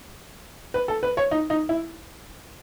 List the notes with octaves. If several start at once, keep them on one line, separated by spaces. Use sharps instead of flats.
B4
A4
B4
C#5
D#4
D#4
E4